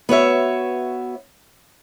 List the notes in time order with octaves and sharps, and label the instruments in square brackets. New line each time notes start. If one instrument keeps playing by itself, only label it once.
[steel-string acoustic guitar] B3 F#4 C#5 E5